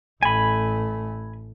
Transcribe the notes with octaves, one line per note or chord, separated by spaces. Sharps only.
A1 A3 G#5 B5